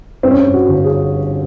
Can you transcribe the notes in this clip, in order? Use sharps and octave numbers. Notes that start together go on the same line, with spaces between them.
G2 C4
C#4
C4
G2
F#4
G1
G#4